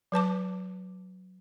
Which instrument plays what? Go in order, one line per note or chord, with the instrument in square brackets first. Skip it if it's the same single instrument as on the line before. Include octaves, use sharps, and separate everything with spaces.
[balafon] F#3 B4 A5 D6